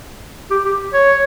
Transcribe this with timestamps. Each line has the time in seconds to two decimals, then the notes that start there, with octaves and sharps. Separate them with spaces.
0.51 G4
0.65 G4
0.93 C#5